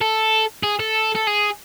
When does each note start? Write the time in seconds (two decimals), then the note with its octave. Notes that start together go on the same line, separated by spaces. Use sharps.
0.01 A4
0.63 G#4
0.79 A4
1.15 A4
1.27 G#4